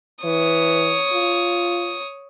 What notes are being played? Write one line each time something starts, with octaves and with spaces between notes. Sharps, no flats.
E3 C#5 D#6
F4